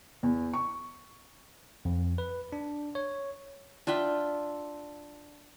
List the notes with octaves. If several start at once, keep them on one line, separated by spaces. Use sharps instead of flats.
E2
C#6
F2
B4
D4
C#5
D4 F4 E5 G5